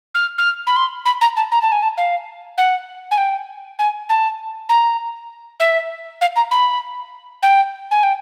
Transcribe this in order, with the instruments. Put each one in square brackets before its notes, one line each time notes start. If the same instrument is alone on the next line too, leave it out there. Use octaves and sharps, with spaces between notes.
[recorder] F6
F6
B5
C6
B5
A#5
A5
A#5
A5
G#5
A5
F5
F#5
G#5
G5
G#5
A5
A#5
E5
F5
A#5
B5
G5
G#5
G5